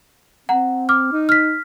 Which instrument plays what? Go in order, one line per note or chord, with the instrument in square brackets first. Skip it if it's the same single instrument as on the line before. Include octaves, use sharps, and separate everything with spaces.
[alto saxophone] C4 [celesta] F#5 A#5
[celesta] D6 F6
[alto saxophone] D#4
[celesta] F6 B6